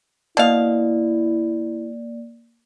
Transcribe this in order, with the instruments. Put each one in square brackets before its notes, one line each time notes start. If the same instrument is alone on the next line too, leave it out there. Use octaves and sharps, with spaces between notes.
[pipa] B2 F5 [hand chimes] A#3 D5 [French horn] E4